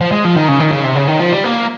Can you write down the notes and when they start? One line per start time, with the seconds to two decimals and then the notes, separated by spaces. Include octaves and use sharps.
0.01 F3
0.12 G#3
0.25 F3
0.36 D#3
0.48 C#3
0.60 D#3
0.72 C#3
0.84 C3
0.96 C#3
1.08 D#3
1.20 F3
1.32 G3
1.44 A#3